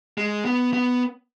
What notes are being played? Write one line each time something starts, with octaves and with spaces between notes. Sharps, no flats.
G#3
B3
B3